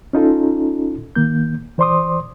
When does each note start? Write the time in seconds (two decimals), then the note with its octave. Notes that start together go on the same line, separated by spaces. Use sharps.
0.13 C#4 D#4 F4 A4
1.16 D#3 A#3 G6
1.78 E3 C5 D5 C6 D6 D#6